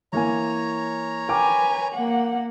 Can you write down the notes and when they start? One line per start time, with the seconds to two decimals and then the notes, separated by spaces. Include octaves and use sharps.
0.13 E3 A#3 C#5 G#5 A#5
1.29 A#4 B4 G5 G#5 D6
1.94 A#3 F#5